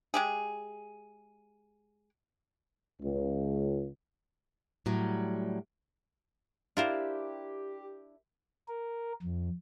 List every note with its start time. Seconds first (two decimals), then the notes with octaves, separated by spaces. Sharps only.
0.14 G#3 G4 G#4
3.02 C#2
4.86 A2 F#3 G3
6.77 D4 E4 F4 G4 A#4 C5
8.68 A#4
9.23 F2